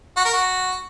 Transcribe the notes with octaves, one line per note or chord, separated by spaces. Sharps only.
F#4
A#4
F#4